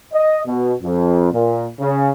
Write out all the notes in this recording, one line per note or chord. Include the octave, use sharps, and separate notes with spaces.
D#5
B2
F2
A#2
C#3